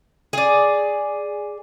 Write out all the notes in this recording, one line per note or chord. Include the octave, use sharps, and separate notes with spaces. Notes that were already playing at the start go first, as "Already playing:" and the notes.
G#4 D5